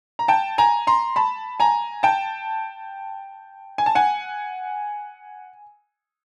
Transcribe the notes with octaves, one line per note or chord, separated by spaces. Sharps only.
A#5
G5 A5
G#5 A#5
A#5 C6
A5 B5
G#5 A#5
G5 A5
G#5
A5
F#5 G#5